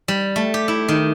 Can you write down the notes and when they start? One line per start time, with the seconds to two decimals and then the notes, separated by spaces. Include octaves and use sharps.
0.08 G3
0.36 A3
0.54 G4
0.68 E4
0.88 D#3